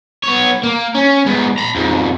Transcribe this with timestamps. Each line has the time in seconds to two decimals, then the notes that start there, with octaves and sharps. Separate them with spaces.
0.23 B3 C#5
0.63 A#3
0.95 C#4
1.26 G#2 B3
1.58 A#5 B5
1.75 F2 G#2